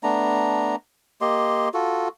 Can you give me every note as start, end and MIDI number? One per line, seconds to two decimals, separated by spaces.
0.03 0.75 57
0.03 0.75 59
0.03 0.75 62
0.03 0.75 82
1.21 1.69 58
1.21 1.69 67
1.21 1.69 75
1.21 1.69 84
1.74 2.08 65
1.74 2.08 66
1.74 2.08 69